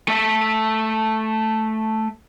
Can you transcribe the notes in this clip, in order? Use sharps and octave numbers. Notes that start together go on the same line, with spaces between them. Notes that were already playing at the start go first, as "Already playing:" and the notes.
A3 E5